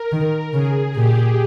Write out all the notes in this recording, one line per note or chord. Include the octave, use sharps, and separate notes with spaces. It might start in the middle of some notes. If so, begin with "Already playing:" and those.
Already playing: A#4
D#3
C#3 G#4
A#2 G4